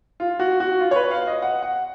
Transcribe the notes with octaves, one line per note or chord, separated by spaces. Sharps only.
F4
F#4
F#4
F4
C#5
B4
F5
D#5
F#5
F#5